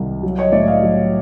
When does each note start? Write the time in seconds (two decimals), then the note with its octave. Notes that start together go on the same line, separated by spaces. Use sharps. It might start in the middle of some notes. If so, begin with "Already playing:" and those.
Already playing: C2 C3 D#3
0.23 F#3
0.38 C#5 D#5
0.52 A2 D5 E5
0.68 D#5 F5
0.83 F#3